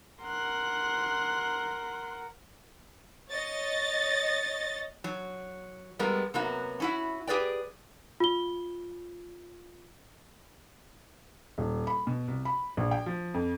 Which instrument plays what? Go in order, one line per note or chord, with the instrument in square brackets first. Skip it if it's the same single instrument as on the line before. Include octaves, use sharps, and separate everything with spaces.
[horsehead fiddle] A#4 F#5 [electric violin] C6 F#6
[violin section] C#5 D#5 A6
[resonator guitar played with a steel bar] F#3
G3 G#3 B3 A#4
C3 F#3 A#3 B3 F#4
C#4 E4 F#4
G4 G#4 B4 D5 G5
[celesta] F4 G7
[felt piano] D#1
B5
B2
C2
B5
A#1
G5
F3
F2